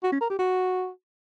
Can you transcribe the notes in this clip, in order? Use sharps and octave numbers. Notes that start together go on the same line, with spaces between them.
F#4
C#4
A#4
G4
F#4